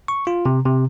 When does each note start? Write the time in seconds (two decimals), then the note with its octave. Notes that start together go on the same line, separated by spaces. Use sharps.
0.08 C#6
0.27 F4
0.46 C3
0.66 C3